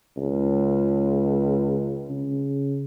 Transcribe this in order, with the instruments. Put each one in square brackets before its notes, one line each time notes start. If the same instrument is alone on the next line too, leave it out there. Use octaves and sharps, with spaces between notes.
[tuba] C#2
C#3